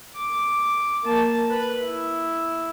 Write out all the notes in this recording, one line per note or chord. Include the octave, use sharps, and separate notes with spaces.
D6
A#3 A5
B4
E4